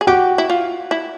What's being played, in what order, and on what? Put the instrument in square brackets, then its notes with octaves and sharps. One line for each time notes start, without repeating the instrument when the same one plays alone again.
[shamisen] G#4
[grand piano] F#4 [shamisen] G4
[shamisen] E4
F4
E4